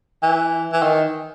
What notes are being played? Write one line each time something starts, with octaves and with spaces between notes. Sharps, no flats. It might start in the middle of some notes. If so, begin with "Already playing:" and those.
E3
E3
D#3